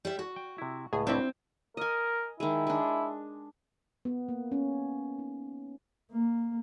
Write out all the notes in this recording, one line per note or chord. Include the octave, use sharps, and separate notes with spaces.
G3 E5
F#4
G5
C3 E4
C#2 A2 G#4
F#3 C4 D4 E4
A#4 D#5 G#5
D#3 G#3 E4
G#3 D4
B3
A#3
C#4
D#4
A#3